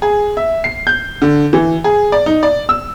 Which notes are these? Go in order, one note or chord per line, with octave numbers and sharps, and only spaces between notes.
G#4
E5
C7
G6
D3
E3
G#4
D5
D#4
D5
E6